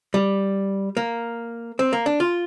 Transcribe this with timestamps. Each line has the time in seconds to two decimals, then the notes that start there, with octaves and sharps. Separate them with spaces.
0.14 G3
0.97 A#3
1.79 C4
1.93 A#3
2.06 D4
2.20 F4